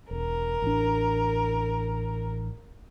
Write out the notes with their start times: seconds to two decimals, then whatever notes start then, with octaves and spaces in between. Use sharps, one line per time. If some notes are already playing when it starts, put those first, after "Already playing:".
0.11 E1 A#4
0.62 A1 D4